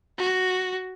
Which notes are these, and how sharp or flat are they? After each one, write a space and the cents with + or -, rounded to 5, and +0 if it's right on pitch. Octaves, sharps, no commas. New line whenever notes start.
F#4 +5